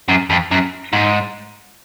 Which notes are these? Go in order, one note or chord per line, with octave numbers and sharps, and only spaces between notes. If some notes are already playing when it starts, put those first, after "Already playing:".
F#2
F2
F#2
G#2